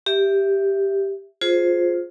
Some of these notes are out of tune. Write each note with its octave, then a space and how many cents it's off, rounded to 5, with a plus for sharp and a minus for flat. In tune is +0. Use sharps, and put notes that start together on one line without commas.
G4 +0 E5 +0
F4 +15 G#4 +15 C5 +0